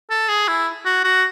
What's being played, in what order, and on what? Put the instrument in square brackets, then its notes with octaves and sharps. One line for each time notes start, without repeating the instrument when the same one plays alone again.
[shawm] A4
G#4
E4
F#4
F#4